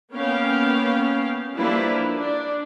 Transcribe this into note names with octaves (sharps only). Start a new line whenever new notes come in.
A#3 B3 C#4 F5 G5
F3 G3 A#3 D4 E4 B4
D4